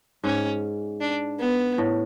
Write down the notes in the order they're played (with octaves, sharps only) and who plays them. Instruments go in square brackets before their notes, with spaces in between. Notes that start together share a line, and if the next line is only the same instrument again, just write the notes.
[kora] G#2 [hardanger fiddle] C#4
[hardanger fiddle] D4
B3
[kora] A2